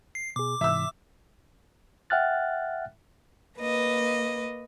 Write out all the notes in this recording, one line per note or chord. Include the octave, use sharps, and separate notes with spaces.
C7
B2 G#4 D6
G#2 C3 E3 E5 E6
E5 F#5 G5 F6 F#6 A6
A#3 B4 D#5